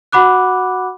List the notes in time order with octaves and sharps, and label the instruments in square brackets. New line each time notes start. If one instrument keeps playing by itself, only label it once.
[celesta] F#4 F#5 B5 D6 F#6